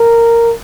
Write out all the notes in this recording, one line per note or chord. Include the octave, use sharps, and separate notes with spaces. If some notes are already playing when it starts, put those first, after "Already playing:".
Already playing: A#4